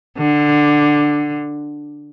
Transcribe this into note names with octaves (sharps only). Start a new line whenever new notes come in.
D3